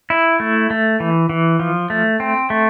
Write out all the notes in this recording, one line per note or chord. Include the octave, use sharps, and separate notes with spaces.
E4
A3
A3
E3
E3
F3
A3
C4
A3